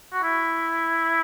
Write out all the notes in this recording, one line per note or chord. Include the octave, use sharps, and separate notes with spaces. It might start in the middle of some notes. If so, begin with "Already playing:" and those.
F#4
E4